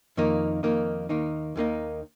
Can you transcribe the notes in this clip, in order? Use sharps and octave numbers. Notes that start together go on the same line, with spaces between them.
F2 D#3 A#3 D#4
F2 D#3 A#3 D#4
D#2 D#3 A#3 D#4
D#2 D#3 A#3 D#4